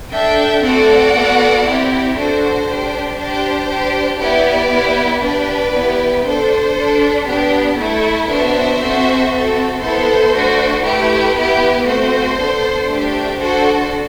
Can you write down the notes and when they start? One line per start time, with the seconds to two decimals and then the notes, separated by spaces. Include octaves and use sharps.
0.11 D4 A4 E5 G5
0.62 A3 C4 F#4 A4 D5 F#5
1.13 B3 F#4 A4
1.64 C4 E4 G4
2.15 D4 F#4 A4 C5
2.66 D4 G4
3.17 D4 G4 C5
3.68 D4 G4
4.19 B3 E4 G4 B4 D5
4.70 B3 E4 G4
5.21 D4 G4 B4 D5
5.72 B3 E4 G4
6.23 D4 A4 C5
6.74 D4 A4
7.26 B3 D4 G4
7.77 A3 E4 A4
8.27 B3 D4 F#4 C5 E5
8.78 C4 F#4 A4
9.30 C4 F#4 A4
9.80 B3 E4 A4 C5
10.31 A3 D4 F#4
10.83 A3 E4 G4 B4
11.34 B3 E4 G4
11.85 A3 C4 F#4 C5
12.36 B3 D4 A4
12.87 A3 D4 G4
13.38 D4 F#4 A4 C5